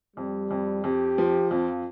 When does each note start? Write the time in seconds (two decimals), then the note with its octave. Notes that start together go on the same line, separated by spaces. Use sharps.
0.17 F2 G3
0.51 F2
0.84 F2 G4
1.18 F3
1.51 F2 F4